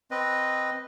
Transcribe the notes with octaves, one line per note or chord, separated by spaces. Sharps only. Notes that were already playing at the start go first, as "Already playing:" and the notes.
C4 B4 D#5